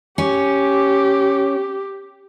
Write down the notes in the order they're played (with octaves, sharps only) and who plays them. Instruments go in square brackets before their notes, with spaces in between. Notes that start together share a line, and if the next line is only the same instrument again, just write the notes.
[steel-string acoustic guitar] C#4 [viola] G4